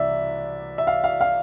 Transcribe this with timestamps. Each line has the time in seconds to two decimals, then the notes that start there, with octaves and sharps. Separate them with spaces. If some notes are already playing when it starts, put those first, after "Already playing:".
Already playing: C2 C3 E3 D5 E5
0.78 E5
0.87 F5
1.04 F5
1.21 F5